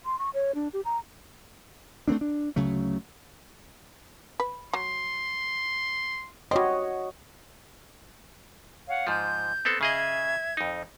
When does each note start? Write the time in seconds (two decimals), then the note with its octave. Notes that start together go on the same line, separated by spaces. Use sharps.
0.05 C6
0.19 C#6
0.34 C#5
0.55 D4
0.73 G4
0.85 A#5
2.08 A3 A#3 C4 D4
2.21 D4
2.56 D2 C#3 F#3 A3
4.40 B4
4.73 F#3 C6
6.51 G3 C4 F#4 C#5 D#5
8.87 C#5 F5 F#5
9.07 G#2 F3 G6
9.65 B3 C4 A4
9.81 C#3 G#4 D#5 E5 G#6
10.57 F2 D#4